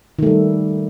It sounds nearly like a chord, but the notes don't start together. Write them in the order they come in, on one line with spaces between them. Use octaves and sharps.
D#3 A3 G3